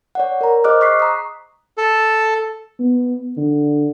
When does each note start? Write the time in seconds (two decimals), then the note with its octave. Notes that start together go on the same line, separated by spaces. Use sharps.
0.15 C#5 D5 F#5
0.41 A#4 A#5
0.64 G#4 C5 D#5 D6 F6 F#6
0.81 C#6 F#6 B6 C7
0.99 A#5 D#6
1.78 A4
2.79 B3
3.37 D3